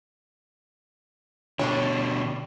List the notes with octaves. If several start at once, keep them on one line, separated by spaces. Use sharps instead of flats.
B2 D3 G3 D4 C#5